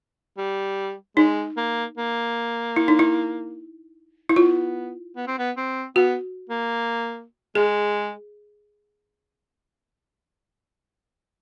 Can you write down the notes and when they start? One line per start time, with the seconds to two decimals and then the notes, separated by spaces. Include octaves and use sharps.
0.37 G3
1.17 G#3 D#4
1.57 A#3
1.97 A#3
2.76 E4
2.88 D#4
2.99 E4
4.29 E4
4.36 B3 F4
5.16 B3
5.27 C4
5.38 B3
5.57 C4
5.96 B3 F#4
6.49 A#3
7.55 G#3 G#4